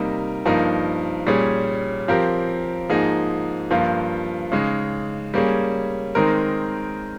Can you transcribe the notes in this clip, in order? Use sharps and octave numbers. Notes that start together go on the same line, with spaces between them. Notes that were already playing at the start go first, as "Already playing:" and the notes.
Already playing: C3 G3 A#3 D#4 A#4
G2 F3 A#3 D#4 A#4
A#2 G3 C#4 G#4
F3 C4 G4 A#4
G#2 F3 A#3 D#4 G#4
G2 F3 A#3 F4
C#3 G#3 D#4
G3 A#3 C#4 G#4
D#3 G#3 C4 D#4 A#4